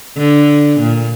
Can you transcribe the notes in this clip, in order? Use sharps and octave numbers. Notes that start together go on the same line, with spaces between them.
D3
A#2